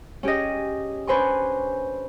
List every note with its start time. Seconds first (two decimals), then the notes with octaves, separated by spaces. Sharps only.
0.23 C#4 G4 G#4 D#5
1.07 C#4 D4 B4 C5 G#5 C#6